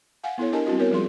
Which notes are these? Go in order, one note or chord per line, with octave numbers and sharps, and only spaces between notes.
F5 F#5 G#5
B3 E4 A4 C#5
D4 G4 A#4 D#5 G#5 A5
G3 C4 E4 F#4 D#5
B3 A#4 C#5
F3 G3 G#3 F4 G#4 C6